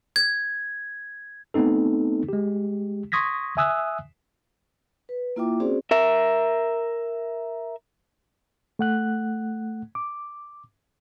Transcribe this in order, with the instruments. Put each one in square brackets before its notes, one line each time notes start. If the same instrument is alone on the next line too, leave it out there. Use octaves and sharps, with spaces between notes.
[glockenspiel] G#6
[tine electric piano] A3 B3 C4 D#4 A4
G#3 G4
C6 C#6 D#6 G#6 A#6 B6
E5 G#5 D#6 E6 F#6
[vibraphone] B4
A#3 E4 F4 E5 G5 D6
C4 C#4 F#4 G#4 C5 D5
[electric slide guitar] A#4 E5
[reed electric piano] A3 F#5 F#6
D6